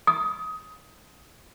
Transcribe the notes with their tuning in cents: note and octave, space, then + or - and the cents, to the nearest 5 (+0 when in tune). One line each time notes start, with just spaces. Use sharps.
D#6 +20